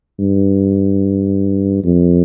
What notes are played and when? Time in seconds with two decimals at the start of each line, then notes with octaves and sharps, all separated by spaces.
0.19 G2
1.84 F2